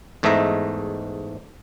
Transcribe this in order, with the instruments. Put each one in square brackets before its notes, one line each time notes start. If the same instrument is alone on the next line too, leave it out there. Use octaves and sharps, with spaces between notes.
[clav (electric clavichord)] E2 G#2 A3 D#5 E5 A#5